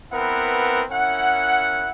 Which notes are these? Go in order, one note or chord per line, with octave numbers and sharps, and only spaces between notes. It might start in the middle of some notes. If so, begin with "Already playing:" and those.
B3 C4 E4 A#4 B4 F#5
C#4 E4 A#4 F#5